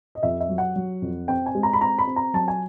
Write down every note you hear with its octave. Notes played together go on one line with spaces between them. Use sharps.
D#5
F2 E5
E5
F#3
F#5
F#3
F2
C4 G5
G#5
G#3
A#5
B5
C4 A#5
B5
C4
A#5
F#3 A5
G#5